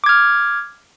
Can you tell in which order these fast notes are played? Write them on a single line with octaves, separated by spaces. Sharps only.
D6 G#6 F6